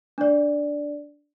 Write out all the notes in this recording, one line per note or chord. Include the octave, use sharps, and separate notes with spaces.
D4 D5